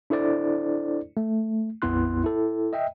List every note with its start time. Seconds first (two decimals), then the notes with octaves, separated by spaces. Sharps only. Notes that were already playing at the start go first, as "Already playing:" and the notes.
0.10 D4 E4 A4 C5 D5
1.17 A3
1.82 A#1 F2 B3 E4 C6 F#6
2.24 E4 A4
2.73 D#5 E5 G5